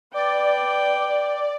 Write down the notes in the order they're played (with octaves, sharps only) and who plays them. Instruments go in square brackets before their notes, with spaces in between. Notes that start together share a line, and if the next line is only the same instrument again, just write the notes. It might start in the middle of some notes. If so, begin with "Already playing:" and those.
[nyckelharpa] B4 G5 [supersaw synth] D5